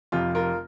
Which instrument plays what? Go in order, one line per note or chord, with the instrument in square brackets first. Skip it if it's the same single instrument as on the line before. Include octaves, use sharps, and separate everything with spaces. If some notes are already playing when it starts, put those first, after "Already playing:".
[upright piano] F1 F2 C3 F4
F4 A#4